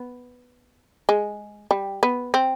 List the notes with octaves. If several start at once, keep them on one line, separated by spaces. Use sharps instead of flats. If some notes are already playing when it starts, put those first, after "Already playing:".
Already playing: B3
G#3
G3
B3
C4